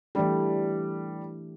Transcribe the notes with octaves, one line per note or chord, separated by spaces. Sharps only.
E3 G3 A3 D4 G4